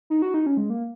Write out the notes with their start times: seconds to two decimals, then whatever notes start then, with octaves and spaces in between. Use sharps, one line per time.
0.10 D#4
0.22 F#4
0.34 D#4
0.46 C#4
0.57 G#3
0.70 A#3